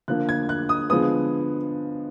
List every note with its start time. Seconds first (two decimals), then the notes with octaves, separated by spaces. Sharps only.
0.08 D3 F3 A#3 F#6
0.29 G#6
0.49 F#6
0.69 D#6
0.90 D3 F3 G#3 B3 D#6